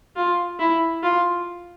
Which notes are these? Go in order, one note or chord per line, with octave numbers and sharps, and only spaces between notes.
F4
E4
F4